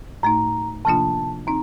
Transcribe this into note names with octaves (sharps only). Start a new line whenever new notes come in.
A2 A3 D#4 A#5
C3 F3 A#3 D4 F4 A5
C4 D#4 A#5